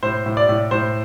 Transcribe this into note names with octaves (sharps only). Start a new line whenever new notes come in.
A2 C5
A2
D5
A2
A2 C5